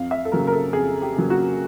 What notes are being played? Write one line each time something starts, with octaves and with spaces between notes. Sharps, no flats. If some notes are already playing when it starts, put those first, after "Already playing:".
Already playing: F2 F5
E5
A4
C#3 F#3 A#3 A#4
A#4
A4
F2 G#4
G4
C#3 F#3 A#3
F#4